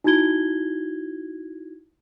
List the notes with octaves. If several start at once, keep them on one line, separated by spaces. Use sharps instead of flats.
D#4 E4 F#4 G#6 G7